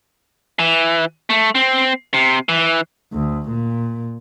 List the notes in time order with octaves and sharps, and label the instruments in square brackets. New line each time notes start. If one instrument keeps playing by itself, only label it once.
[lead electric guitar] E3
A3
C4
C3
E3
[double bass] D2
A#2